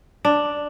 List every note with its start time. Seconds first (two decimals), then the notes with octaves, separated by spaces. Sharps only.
0.25 D4